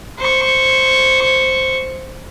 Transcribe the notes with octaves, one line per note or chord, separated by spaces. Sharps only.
C5 C#6